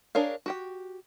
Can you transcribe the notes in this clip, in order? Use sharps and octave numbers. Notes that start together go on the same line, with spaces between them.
D4 G#4 A#4 C#5 F5
F#4 G4 G5